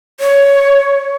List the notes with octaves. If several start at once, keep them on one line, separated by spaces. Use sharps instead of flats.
C#5